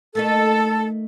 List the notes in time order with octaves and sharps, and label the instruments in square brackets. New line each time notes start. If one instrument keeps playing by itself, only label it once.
[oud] A3 A#3 D#4 [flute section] A4